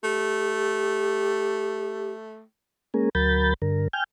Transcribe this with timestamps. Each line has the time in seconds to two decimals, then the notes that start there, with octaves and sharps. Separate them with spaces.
0.03 A3 G4
2.94 G#3 A#3 C#4 G#4 A#4
3.15 D2 F#3 A#4 B5 G6 A6
3.62 G2 D3 A#4
3.93 G5 G#5 F6 G6